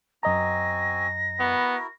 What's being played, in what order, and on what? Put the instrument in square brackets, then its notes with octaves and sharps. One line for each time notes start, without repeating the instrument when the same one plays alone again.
[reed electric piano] F#2 D#5 A#5 [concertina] C4 F#4 G#5 [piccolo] A#6
[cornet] B3 [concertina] E4 F#4 A#4